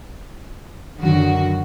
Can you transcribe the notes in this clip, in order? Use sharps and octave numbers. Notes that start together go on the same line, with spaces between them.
F#2 D3 D#3 F#3 F#4